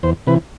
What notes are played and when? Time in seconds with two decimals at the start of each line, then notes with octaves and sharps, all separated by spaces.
0.03 E2 C5
0.27 C3 E3 B4